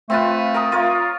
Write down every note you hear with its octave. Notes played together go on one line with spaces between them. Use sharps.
A3 C4 F4 B4
A#4 A#5 D#6
F4 A#4 C#5